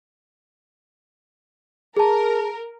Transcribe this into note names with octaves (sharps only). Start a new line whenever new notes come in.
G#4 A#4 A5